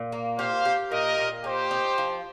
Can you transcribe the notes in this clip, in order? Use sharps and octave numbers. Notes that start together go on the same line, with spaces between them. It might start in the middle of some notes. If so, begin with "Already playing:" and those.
Already playing: A#2
A#3
G4 C5 F5
G4
A#2 A#4 D#5
A#2
D#4 G4 C5
D#4
F3